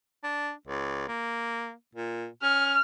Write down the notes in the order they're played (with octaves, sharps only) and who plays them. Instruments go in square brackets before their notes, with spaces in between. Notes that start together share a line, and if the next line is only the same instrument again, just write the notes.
[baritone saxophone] D4
C#2
A#3
A#2
[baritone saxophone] C#4 [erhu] F6